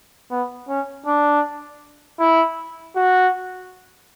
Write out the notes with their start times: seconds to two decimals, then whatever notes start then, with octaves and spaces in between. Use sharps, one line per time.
0.31 B3
0.68 C#4
1.06 D4
2.20 E4
2.96 F#4